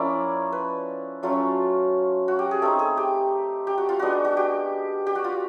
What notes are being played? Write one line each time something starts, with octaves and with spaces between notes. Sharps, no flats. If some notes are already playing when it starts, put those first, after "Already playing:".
Already playing: F3 A#3 C#4 E4 D5
B4
F#3 A3 C#4 F4
F#4
G4
G#4
A3 C4 D#4 A4
G#4
G4
G4
F#4
F4
G#3 B3 D4 F#4
F#4
G4
G4
F#4
F4